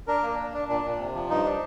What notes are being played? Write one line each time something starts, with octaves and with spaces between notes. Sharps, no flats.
D4 A#4
A#3
D4
D4
A#2 D4
A#2
C3
F3
G2 D#4
D4